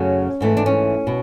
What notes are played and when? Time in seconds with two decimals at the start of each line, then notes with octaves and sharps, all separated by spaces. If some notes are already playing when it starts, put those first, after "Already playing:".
Already playing: F#2 C#3 F#3 A3 C#4
0.41 G#2 E3 A3
0.57 D4
0.66 C#4
1.07 B2